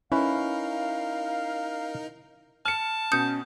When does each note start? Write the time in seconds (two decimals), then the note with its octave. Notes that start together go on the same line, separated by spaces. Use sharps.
0.12 C#4 D#4 E4 A#4 B4 F5
2.66 A5 F6 C#7
3.12 B2 C#4 D#6 G6 C#7